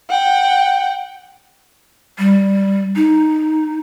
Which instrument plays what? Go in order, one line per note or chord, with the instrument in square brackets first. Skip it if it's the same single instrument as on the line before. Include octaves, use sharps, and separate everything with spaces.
[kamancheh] F#5 G5
[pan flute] G3
D#4